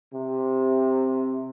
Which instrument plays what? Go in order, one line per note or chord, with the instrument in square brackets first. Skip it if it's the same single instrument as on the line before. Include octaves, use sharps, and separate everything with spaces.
[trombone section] C3